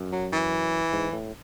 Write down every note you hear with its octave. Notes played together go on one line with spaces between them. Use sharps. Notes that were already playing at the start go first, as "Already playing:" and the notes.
Already playing: F#2
F#3
E3
G#2
A2